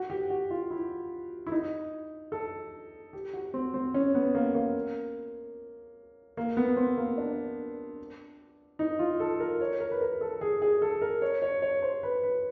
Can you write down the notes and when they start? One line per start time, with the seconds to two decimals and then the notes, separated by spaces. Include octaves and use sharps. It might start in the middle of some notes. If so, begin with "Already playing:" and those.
Already playing: F#4
0.10 G4
0.30 F#4
0.50 F4
0.70 E4
1.47 E4
1.52 D#4
2.32 A4
3.13 G4
3.33 F#4
3.54 C4
3.74 C4
3.94 C#4
4.15 B3
4.35 A#3
4.55 A#3
6.37 A#3
6.57 B3
6.77 C4
6.97 A#3
7.18 D4
8.79 D#4
8.99 F4
9.20 A4
9.40 A#4
9.61 C#5
9.80 A#4
9.91 B4
10.01 A#4
10.21 A4
10.41 G#4
10.62 G#4
10.82 A4
11.02 A#4
11.22 C#5
11.42 C#5
11.62 C#5
11.82 C5
12.03 B4
12.23 B4